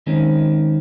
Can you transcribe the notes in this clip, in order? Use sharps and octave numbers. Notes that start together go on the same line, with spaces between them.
D#3 G#3 C4 C#4